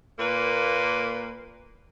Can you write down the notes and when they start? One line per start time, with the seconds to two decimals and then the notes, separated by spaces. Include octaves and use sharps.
0.19 A#2 A#3 B4